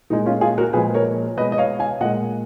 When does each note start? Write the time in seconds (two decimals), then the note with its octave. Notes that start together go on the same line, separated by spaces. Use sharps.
0.10 A#2 G#3 D#4
0.26 C#4 F4
0.41 F4 G#4
0.58 F#4 A#4
0.73 A#2 F3 G#3 G#4 B4
0.94 A#4 C#5
1.37 B2 B4 D#5
1.41 G#3
1.52 D#5
1.58 C#5 F5
1.79 F5 G#5
2.01 A#2 G#3 D#5 F#5